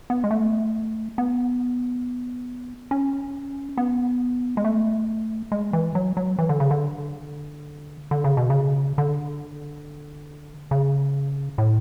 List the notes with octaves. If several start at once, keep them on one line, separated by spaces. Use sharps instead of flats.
B3
G#3
A3
B3
C#4
B3
G#3
A3
G#3
E3
F#3
F#3
E3
D3
C#3
D3
D3
C#3
B2
C#3
D3
C#3
A2